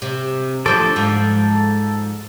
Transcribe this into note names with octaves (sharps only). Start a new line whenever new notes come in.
C3
D2 F3 A4 C5 D6
G#2 F3